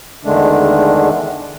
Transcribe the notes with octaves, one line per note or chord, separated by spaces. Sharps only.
E2 D3 D#3 G#3 A3 D4